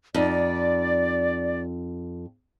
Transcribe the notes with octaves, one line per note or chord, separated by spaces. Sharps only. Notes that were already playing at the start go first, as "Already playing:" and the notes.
F2 D#4 D5